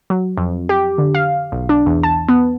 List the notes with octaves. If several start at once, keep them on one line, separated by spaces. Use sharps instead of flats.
F#3
F2
G4
D3
F5
B1
D4
E2
A5
B3